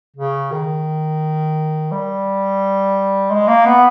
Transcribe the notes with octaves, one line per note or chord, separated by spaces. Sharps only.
C#3
D#3
G3
G#3
A#3
B3